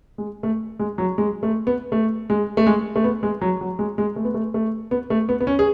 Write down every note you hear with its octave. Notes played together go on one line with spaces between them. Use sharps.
G#3
A3
G#3
F#3
G#3
A3
B3
A3
G#3
A3
G#3
A3
B3
G#3
F#3
F#3
G#3
G#3
A3
B3
A3
A3
B3
A3
B3
B3
C#4
G#4